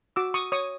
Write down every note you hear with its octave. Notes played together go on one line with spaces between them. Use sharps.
F#4 D6 E6
C#6 D#6
C#5 C#6 D#6